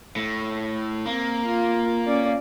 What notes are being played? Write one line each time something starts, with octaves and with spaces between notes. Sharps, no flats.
A2
A#3 C4
F4
C#4 D5